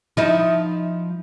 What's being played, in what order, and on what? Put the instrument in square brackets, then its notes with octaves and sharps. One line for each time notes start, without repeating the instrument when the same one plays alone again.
[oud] F3 D#4 E4